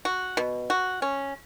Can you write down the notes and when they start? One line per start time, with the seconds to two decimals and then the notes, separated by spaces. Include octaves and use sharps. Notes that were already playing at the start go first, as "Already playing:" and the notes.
0.05 F#4
0.37 B2
0.70 F#4
1.02 C#4